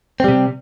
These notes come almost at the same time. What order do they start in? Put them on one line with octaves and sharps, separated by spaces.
C4 G3 C3